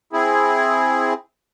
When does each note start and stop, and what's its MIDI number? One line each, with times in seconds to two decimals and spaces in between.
0.13 1.13 60
0.13 1.13 64
0.13 1.13 68